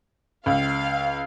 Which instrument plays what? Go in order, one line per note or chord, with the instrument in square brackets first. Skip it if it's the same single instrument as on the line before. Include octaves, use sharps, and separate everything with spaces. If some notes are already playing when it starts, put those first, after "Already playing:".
[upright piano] C#2 [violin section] F5